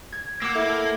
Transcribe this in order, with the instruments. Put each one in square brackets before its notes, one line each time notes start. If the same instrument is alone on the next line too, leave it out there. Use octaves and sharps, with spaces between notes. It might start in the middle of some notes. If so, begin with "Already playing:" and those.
[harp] G#6
[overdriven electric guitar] A#3 [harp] F#5 D6 E6
[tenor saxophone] E4 [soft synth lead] A4